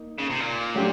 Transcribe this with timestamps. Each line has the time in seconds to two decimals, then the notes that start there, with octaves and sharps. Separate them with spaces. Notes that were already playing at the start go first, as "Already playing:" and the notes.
Already playing: A#3 D#4
0.18 C#3
0.30 C3
0.40 A#2
0.74 F#3 A3 D4 G4